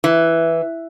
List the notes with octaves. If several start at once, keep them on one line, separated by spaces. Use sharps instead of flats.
E3